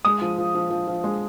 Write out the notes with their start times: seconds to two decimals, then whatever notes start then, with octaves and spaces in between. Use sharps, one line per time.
0.05 G#3 D#6
0.21 F3
0.38 F3
0.55 F3
0.70 F3
0.87 F3
1.04 G#3